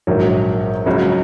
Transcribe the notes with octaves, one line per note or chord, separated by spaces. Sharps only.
A#1 G#2 D#3 F#3
C#2 C#3 F#3